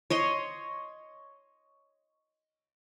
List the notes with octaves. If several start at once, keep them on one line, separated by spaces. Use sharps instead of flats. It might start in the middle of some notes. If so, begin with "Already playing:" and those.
C#5 D#5 C6